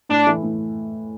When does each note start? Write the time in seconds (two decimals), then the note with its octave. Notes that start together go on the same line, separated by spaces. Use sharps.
0.09 A2 D4
0.27 E3 A3 E4
0.43 A2